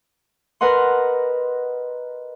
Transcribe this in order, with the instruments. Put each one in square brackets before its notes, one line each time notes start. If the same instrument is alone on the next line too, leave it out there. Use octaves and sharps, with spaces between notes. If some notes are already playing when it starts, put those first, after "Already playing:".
[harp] A#4 B4 D#5 F#5 C6